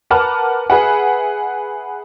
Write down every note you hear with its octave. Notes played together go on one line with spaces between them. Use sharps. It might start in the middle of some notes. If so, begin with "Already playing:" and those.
A#4 B4 F#5 A5 D6 F6
G#4 B4 E5 F#5